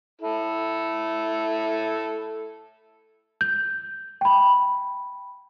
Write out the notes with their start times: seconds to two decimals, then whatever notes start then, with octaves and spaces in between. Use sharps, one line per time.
0.21 E4 A4
3.41 G6
4.21 G5 B5